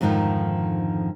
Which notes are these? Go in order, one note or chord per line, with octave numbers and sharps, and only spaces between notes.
F2 G#2 D3 D#3 F3